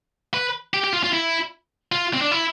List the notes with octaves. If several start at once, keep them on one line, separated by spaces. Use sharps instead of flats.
B4
G4
G4
F4
F4
E4
F4
C4
D4
E4